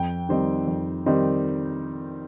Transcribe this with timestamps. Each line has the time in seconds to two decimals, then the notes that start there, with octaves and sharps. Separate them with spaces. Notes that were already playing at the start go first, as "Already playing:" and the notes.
Already playing: F2 G5
0.29 D#3 G3 C4 D#4
0.67 F2
1.06 D#3 G3 C4 D#4